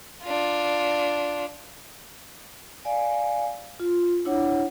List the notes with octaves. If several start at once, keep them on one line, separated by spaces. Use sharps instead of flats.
D4 F4
D5 F5 G#5
F4
D4 E4 C#5 F#5